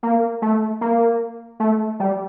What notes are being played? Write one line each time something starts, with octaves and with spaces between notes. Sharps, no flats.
A#3
A3
A#3
A3
G3